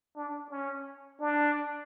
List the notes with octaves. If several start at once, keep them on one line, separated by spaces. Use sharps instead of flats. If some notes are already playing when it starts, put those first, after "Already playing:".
D4
C#4
D4